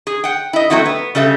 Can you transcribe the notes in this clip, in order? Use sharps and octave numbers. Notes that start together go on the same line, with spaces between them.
G#4
F#5 G5
E4 D#5
F#3 A3 C4 E4 F#4
B3
C#3 G3 A4 E5